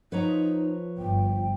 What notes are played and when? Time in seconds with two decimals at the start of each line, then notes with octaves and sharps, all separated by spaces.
0.12 F3 D#4 B4 C#5 A#5
0.98 G1 G5